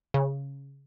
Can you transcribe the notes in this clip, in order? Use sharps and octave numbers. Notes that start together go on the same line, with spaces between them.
C#3